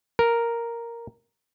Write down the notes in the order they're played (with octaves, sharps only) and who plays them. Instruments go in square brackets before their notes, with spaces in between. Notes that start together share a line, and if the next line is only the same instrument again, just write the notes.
[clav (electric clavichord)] A#4